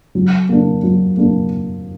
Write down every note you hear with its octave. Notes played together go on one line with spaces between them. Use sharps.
F#3
A#3 D4
F#3
A#3 D4